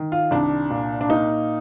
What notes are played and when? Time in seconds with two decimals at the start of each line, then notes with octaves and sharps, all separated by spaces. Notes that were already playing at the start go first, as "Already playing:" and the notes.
Already playing: D#3
0.12 F4
0.31 C2 D4
0.70 A#2
1.01 D4
1.09 A#3 D#4